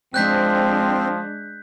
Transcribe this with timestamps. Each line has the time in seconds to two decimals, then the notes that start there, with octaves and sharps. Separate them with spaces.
0.14 F3 G#3 C4 D4 F#6 G6 B6